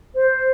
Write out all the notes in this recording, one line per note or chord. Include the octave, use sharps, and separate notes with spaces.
C5